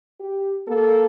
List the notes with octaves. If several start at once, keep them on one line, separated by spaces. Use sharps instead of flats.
G4
A#3 A4